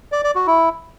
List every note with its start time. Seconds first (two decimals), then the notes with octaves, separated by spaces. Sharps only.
0.12 D5
0.24 D5
0.35 F#4
0.47 E4